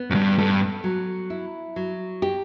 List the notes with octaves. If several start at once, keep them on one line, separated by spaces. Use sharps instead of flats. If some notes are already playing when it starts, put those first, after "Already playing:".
Already playing: B3
F#2
G2
G2 A4
F#3
E4
F#3
G4